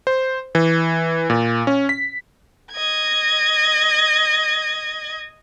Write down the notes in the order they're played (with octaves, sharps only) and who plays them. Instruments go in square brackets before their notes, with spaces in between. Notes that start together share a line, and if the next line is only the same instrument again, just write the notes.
[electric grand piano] C5
E3
A#2
C#4
B6
[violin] D#5 G#6